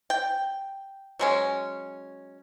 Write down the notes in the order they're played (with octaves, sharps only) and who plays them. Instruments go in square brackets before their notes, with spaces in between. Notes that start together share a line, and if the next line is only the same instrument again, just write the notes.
[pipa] G5
F#3 G#3 C#4